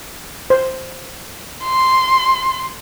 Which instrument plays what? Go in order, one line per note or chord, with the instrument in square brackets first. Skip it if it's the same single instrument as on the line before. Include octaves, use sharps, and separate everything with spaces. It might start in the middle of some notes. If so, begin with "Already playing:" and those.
[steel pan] C5
[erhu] C6